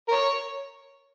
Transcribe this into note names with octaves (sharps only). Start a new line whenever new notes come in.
A#4
C#5